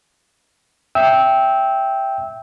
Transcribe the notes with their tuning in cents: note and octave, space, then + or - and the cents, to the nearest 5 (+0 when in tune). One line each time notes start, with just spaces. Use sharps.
E5 +0 G5 +0 E6 -20